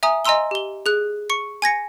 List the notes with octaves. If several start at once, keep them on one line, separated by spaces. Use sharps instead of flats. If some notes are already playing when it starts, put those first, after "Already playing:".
E5 G#5 A#5 D#6
D#5 G#5 A#5 C6 E6 G7
G4 G7
G#4 F#6
C#6 C#7
G#5 G#6 A#6 C#7